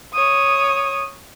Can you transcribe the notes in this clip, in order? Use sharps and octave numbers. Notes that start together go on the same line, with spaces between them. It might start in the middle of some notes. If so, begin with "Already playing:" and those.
C#5 D#6